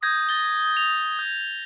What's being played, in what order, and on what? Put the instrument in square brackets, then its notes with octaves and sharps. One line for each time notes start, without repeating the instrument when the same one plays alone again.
[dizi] D#6 [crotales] G6 G#6 A#6
[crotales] A6 G7
F7
G6